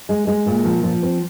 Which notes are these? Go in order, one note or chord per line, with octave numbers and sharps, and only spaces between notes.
G#3
G#3
A#2
F3
F3
C4